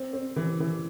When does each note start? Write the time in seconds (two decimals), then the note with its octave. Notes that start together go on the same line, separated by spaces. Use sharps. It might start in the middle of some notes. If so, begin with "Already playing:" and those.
Already playing: C4
0.13 C4
0.36 E3
0.60 E3